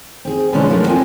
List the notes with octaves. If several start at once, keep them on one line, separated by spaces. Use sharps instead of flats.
C4 G#4
B2 D3 F3 G#3 C#4 D4
F3 F#3 A3 A#3 F4 A#4
C4 F4 D#5 G#5